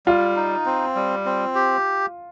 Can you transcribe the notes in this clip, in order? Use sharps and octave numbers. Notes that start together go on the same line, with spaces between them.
G3 F4
D#4
C4
G3
C4
G4